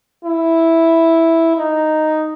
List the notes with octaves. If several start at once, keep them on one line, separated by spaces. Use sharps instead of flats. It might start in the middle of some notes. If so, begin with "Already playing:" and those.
E4
D#4